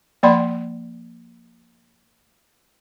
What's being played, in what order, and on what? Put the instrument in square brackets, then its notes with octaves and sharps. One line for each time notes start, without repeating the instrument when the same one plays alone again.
[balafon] F3 A#3 D5 G5 B5 C6